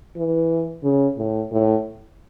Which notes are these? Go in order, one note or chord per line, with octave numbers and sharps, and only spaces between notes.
E3
C#3
A2
A2